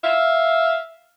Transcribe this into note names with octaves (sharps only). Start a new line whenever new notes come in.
E5 F5